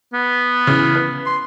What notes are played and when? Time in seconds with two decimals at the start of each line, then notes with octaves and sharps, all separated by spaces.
0.13 B3
0.67 C#3 E3
0.95 B4
1.26 C6